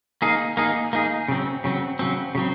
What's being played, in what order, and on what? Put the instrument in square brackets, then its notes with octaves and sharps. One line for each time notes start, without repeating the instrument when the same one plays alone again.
[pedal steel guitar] A#3 D#4 G#4
A#3 D#4 G#4
A#3 D#4 G#4
C#3 F#3 C4
C#3 F#3 C4
C#3 F#3 C4
C#3 F#3 C4